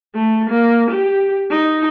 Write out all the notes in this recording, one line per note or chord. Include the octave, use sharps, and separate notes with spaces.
A3
A#3
G4
D#4